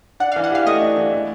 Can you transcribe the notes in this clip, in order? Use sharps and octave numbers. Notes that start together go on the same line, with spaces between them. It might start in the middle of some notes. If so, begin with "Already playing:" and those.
D4 F#5
F5
E3
F#5
G4 F5
A3 D#5
D4
E3
A3